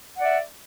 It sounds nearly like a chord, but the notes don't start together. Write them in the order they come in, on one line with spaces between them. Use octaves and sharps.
F#5 D5 E5